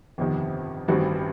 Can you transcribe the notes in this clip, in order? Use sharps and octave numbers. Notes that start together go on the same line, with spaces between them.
G1 F2 C3 D#3
A1 G2 D#3 G3 C4 F#4